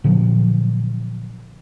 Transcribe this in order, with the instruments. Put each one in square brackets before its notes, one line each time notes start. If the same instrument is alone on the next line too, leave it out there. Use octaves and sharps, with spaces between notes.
[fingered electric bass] A#2 D3 F3 F#3